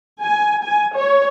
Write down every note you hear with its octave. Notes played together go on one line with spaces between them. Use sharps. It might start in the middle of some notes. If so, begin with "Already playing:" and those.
G#5
G#5
C#5